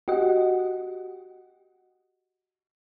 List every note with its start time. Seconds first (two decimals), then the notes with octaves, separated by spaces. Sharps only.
0.08 F#4 G4 D#5 F#5